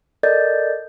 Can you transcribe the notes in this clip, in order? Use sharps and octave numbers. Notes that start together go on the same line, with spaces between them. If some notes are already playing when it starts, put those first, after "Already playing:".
A4 A#4 D5 D#5 G6 A6